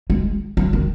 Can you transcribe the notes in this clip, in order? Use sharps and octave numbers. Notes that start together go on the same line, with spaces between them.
G#3
F#3
D#3